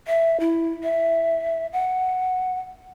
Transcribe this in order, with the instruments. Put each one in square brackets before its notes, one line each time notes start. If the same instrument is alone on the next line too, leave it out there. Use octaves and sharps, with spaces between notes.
[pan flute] E5
E4
E5
F#5